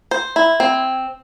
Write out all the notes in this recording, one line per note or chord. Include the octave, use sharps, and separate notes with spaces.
C5
E4
C4